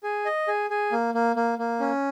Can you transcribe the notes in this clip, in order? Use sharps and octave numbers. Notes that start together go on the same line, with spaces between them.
G#4
D#5
G#4
G#4
A#3
A#3
A#3
A#3
C#4